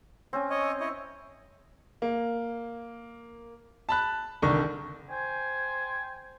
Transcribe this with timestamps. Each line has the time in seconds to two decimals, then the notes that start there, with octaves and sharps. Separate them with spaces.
0.33 C4 C#4 G#5
0.50 C#5 D#5
0.80 E4 C#5 D#5
2.02 A#3
3.89 A5 B5 F#6
4.42 C2 D3 D#3 C#6
5.09 C5 G5 G#5